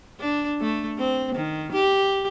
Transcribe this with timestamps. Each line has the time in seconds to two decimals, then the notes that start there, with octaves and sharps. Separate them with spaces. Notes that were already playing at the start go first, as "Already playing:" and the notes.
0.20 D4
0.61 A3
0.98 C4
1.35 D#3
1.72 G4